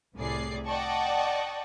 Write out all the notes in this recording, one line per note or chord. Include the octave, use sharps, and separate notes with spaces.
C2 A2 C3 G#4 D5 C7
D5 D#5 F#5 G5 A5 C#6